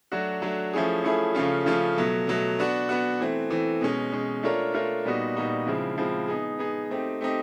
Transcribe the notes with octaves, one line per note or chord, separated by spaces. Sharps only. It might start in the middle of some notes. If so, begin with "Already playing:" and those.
F#3 A3 D4 F#4
F#3 A3 D4 F#4
F3 A3 C#4 E4 G#4
F3 A3 C#4 E4 G#4
C#3 F3 A3 C#4 F4
C#3 F3 A3 C#4 F4
B2 F#3 A3
B2 F#3 A3
B3 D4 F#4
B3 D4 F#4
E3 A3 C4
E3 A3 C4
B2 G#3 C#4
B2 G#3 C#4
A3 D4 F4 A#4 C#5
A3 D4 F4 A#4 C#5
A#2 G3 B3 D#4 F#4
A#2 G3 B3 D#4 F#4
C#3 F3 G#3 C4 E4
C#3 F3 G#3 C4 E4
B3 D#4 G#4
B3 D#4 G#4
A3 C4 D#4 G4
A3 C4 D#4 G4